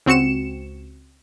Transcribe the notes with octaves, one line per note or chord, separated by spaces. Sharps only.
C#2 C4 F#4 C#7 E7